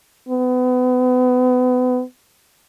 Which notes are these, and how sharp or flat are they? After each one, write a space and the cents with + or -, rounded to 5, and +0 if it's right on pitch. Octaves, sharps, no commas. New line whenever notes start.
B3 +30